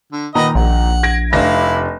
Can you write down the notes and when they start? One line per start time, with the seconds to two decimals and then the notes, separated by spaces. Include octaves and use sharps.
0.12 D3
0.35 A#2 D#3 B4 D#5 F#5 A#5
0.55 A#1 F#5
1.03 G#6 A#6 D7
1.33 F1 D4 E4 F5 A#6